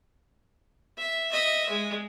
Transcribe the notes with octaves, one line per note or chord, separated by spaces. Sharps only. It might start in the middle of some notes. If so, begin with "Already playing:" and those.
E5
D#5 E5
G#3